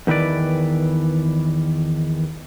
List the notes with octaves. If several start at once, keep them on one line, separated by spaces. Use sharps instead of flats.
E2 D#3 E4 B4 D5